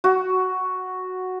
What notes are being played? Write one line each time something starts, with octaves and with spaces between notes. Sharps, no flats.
F#4